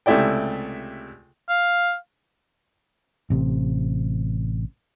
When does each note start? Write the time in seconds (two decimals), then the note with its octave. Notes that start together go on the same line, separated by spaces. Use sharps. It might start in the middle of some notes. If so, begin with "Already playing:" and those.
0.06 C#2 C3 A3 E4 D5 G5
1.49 F5
3.30 A1 C3